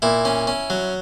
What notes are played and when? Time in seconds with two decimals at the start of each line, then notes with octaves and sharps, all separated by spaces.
0.02 A#2 E4
0.25 C#4
0.47 C#4
0.70 F#3